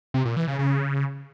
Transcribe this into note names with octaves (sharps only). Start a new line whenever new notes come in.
C3
A#2
E3
C#3
C#3